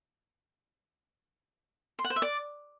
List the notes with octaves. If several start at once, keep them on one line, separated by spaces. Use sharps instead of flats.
C6
F#5
C5
E5
D5